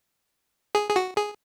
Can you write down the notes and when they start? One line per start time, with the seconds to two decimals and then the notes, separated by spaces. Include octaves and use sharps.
0.75 G#4
0.90 G#4
0.96 F#4
1.17 G#4